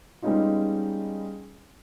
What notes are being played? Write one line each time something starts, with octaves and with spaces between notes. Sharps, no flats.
G3 G#3 B3 C#4 D#4 F4